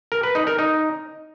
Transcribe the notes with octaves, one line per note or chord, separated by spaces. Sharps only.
A#4
B4
D#4
A#4
D#4